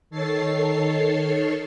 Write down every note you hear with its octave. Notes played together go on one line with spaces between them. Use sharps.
D#3 A4 C#5 A6 C7